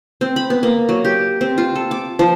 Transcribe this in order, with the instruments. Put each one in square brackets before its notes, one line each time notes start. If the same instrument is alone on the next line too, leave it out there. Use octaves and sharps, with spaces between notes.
[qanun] C4
B5
B3
A#3
F#3
G4
C4
F4
A4
D6
F3